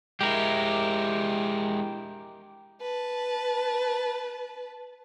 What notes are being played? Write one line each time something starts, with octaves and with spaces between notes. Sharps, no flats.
G#3 E4 G4 A#4
B4 A5